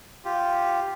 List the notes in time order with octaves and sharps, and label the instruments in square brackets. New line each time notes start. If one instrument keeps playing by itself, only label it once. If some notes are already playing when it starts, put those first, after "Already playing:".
[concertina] F4 G4